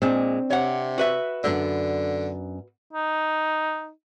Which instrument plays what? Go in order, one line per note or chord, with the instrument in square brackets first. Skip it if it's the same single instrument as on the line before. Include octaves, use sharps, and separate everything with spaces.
[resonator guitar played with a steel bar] A#2 G#3 [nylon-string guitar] C4 D4
[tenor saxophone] C3 [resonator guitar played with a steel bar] C#5 F#5
[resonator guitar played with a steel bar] F#4 B4 E5
[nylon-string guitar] F#2 B3 D4 [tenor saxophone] D3
[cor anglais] D#4